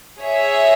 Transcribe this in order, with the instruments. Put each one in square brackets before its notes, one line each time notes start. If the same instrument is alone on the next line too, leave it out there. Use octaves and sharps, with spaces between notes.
[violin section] G#4 C#5 E5